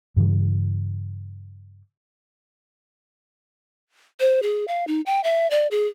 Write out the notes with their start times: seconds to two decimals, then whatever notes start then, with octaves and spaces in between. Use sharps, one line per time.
0.16 G2 C#3 E3 G3
4.20 C5
4.42 G#4
4.68 F5
4.87 D#4
5.06 G5
5.24 E5
5.51 D5
5.71 G#4